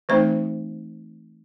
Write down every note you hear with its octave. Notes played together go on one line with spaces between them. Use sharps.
E3 A3 C4 D#4 C5